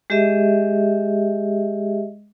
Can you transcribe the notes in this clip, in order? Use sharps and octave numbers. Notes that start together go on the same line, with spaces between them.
G#3 G4 G#4 D#5 E5